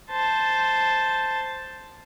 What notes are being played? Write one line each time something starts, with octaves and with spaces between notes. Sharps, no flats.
C5 A5